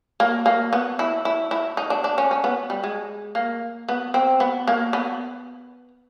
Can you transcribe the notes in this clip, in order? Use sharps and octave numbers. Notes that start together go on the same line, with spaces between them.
A#3
A#3
B3
E4
E4
E4
D#4
D4
D4
C#4
C#4
B3
G3
G#3
A#3
B3
C4
B3
A#3
B3